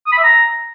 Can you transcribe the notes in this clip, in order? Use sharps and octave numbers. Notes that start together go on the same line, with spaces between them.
D#6
B5
E5
A#5